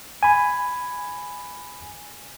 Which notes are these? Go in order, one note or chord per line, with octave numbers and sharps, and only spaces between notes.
G#5 B5